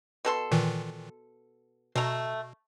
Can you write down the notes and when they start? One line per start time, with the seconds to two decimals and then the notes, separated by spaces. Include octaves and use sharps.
0.25 B2 A4 C6
0.51 A#2 D#3 E3
1.96 B2 A3 A#5